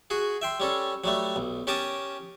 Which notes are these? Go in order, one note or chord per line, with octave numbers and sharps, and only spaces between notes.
F#4 G#4
E5 G5 C6
G3 C#4 A4
F#3 G3 A3
B1
C#4 G4 A#4 A5 D6 D#6